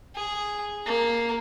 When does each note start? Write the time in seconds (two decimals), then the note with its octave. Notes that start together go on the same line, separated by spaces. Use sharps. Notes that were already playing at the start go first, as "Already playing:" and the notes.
0.15 G#4
0.86 A#3